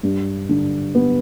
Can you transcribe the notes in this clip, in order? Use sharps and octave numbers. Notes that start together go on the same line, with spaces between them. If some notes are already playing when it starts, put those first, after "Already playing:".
G2
D3
B3